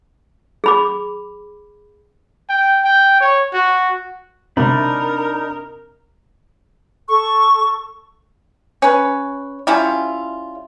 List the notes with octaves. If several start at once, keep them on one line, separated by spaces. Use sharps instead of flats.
G#4 B5 D6
G5
G5
C#5
F#4
C3 D4 D#4 A#4 B5
A4 C#6
C#4 B4
G3 C#4 E4 F4